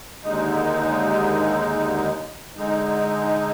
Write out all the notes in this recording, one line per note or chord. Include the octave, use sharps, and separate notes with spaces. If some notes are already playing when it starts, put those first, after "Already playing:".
D#2 D3 G#3 D#4
D3 G#3 D#4